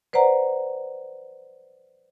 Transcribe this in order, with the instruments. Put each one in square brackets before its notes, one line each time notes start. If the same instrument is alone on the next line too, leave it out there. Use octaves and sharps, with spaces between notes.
[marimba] B4 C5 D5 F#5 A#5